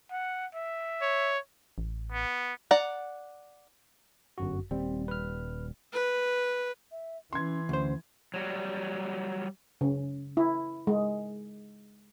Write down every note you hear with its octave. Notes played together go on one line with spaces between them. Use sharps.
F#5
E5
C#5
A1
B3
D5 F#5 A#5
G1 F#2 F#4
D#1 G3 C4
B4 F6
B4
E5
E3 C#4 C6 G#6
D2 C#4 C5
F#3 G3
C#3
E4
G#3